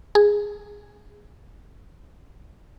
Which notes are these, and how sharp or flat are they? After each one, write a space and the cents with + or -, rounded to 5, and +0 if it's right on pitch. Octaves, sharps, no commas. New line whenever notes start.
G#4 -10